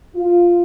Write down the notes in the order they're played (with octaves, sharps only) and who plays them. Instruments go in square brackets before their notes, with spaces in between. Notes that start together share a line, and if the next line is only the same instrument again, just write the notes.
[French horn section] F4